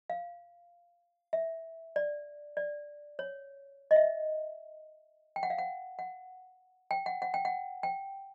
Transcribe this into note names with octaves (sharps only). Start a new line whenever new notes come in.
F5
E5
D5
D5
C#5
D#5
E5
G5
F#5
F5
F#5
F#5
G5
F#5
F#5
G5
F#5
G5